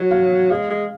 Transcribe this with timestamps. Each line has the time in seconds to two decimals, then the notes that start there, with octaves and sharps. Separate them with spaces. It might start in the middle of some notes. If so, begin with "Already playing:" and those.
Already playing: F#3
0.11 F5
0.50 G#3 F5
0.70 G#3